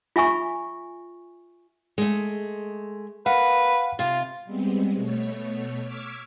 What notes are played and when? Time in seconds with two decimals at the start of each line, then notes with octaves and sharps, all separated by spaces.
0.16 F4 E5 G#5 C#6
1.98 G#3 A3
3.26 A#3 B4 F5 F#5
3.99 C3 F4
4.45 G3 G#3 B3 C4
4.96 B2 A3 C#5
5.83 C#6 D6 E6 F6 G#6 B6